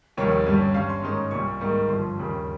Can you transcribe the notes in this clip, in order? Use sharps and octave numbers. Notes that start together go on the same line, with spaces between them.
F1 D#2 D#3 G3 A#3 C#5
G1 G2 G3 C#4
G2 G3 C#4 F5
C6
G#2 D#3 A#3 C#4
C2 A#2 G3 C#6
G#2 D#3 G3 A#3
G1 G2 F3 C6
D#2 C#3 G3 A#3